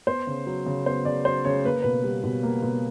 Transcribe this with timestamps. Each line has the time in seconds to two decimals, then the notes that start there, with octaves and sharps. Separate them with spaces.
0.07 B3 C5
0.27 C#3
0.47 F#3
0.66 C#3
0.85 B3 C5
1.05 C#3 D5
1.25 F#3 C5
1.45 C#3 C#5
1.65 A#3 B4
1.82 B2 B4
2.04 G3
2.24 B2
2.43 A#3
2.63 B2